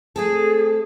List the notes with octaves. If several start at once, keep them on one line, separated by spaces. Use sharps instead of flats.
A3 C4 G#4 A4